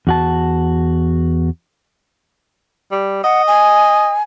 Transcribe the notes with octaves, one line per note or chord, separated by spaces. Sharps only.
E2 F#4 A5
G3
D#5 F#5
G#5